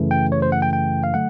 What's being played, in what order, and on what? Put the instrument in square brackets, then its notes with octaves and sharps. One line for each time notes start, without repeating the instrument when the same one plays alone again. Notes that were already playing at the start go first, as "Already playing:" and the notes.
Already playing: [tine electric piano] F#2 C#3 E3 A3
G5
C#5
C5
F#5
G5
G5
F5
D3 F#3 A3 F#5